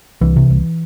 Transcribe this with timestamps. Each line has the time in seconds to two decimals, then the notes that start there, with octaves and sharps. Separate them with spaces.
0.21 C2 E3
0.36 C3
0.50 C2